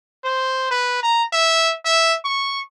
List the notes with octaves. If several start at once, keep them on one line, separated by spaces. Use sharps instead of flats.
C5
B4
A#5
E5
E5
C#6